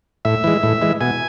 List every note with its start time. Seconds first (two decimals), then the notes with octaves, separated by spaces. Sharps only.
0.25 A2 E5
0.44 E3 G#3
0.63 A2
0.82 E3 G#3
1.01 B2 G#5